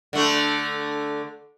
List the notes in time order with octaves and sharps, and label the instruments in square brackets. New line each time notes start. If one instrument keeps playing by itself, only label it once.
[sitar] D3 A3